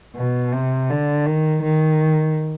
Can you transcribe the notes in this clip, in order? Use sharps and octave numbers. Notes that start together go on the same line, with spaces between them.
B2
C3
D3
D#3
D#3